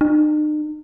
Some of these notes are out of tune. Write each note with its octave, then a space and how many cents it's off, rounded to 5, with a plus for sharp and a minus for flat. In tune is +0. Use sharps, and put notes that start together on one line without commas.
D#4 -45